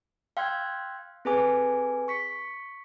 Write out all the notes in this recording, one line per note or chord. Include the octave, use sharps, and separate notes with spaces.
F5 G5 C6 E6 F#6 G#6
C4 G#4 A4 B4 G#5 D6
C#6 B6 C#7